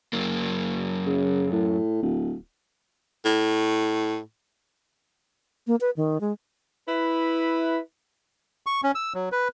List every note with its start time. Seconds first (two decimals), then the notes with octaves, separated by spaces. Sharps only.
0.13 F#2 A#3
1.06 C#3
1.52 A2
2.02 D1
3.25 A2
5.67 A#3
5.81 B4
5.97 D#3
6.21 G#3
6.88 E4 B4
8.66 C#6
8.83 C#4
8.95 E6
9.14 F#3
9.32 B4